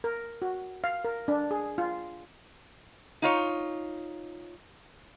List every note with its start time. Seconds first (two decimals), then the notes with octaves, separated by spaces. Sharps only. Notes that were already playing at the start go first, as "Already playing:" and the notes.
0.04 A#4
0.42 F#4
0.84 F5
1.05 A#4
1.28 D4
1.51 G#4
1.78 F4
3.22 D#4 F4 C#5